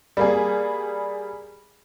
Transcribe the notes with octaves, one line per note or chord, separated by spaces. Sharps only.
G3 A#3 G#4